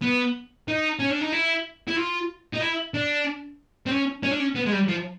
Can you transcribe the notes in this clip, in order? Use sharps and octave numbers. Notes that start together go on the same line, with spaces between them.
B3
D#4
C#4
D4
D#4
E4
E4
F4
D#4
E4
D4
C4
C#4
C#4
D4
C#4
B3
G#3
G3
F3